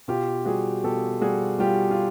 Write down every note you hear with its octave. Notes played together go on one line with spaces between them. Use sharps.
B2 F4 G4
G3 F#4 G#4
B2 G4 A4
G3 F#4 G#4
G3 F4 G4
F4